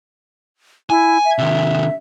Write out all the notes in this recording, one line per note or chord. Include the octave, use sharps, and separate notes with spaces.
E4 G#5
E5
C3 D#3